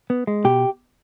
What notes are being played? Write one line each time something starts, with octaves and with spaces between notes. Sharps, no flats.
B3
G#3
B2 G4